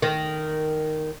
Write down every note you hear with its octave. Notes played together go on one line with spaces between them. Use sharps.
D#3